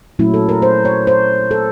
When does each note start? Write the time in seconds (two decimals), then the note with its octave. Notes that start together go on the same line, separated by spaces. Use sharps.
0.19 A#2 F#3 A3 C#4 E4
0.34 A4
0.49 A#4
0.62 C5
0.85 C#5
1.07 C5
1.51 A4